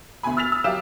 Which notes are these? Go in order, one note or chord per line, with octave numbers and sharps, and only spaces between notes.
D2 B2 G#5 B5
E6 F6 A6 B6 F7
D#6 E6
F#3 G4 E5 F5 E7